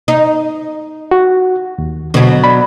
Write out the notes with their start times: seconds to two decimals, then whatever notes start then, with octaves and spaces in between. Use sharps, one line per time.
0.08 D#4
1.11 F#4
1.78 D#2
2.14 B2 D3 F#3
2.43 D5 B5